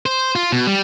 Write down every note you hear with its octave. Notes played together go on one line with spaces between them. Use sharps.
C5
F4
B2
G3